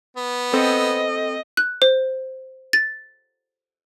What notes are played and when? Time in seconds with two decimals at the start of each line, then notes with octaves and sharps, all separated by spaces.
0.16 B3
0.53 C4 A4 C5 D#5
1.57 F#6
1.82 C5
2.73 A6